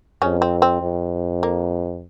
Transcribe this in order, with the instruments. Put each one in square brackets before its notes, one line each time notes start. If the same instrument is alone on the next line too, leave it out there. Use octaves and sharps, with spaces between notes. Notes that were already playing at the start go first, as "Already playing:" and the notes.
[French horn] F2 [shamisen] C#3 C#4
[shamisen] C4
C4
[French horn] F2
[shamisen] A#3